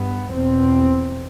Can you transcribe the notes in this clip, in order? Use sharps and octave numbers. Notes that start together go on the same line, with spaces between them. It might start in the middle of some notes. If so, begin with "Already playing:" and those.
Already playing: G2 B3
E2 B2 C4